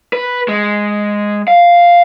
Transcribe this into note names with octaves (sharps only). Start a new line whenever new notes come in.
B4
G#3
F5